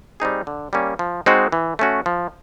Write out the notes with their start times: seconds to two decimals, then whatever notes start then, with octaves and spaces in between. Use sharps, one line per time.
0.20 G3 C4 D#4 G#4
0.47 D3
0.73 G3 A#3 C#4
0.99 F3
1.26 G#3 C4 D#4 F#4
1.52 E3
1.79 A3 C#4 F#4
2.06 F3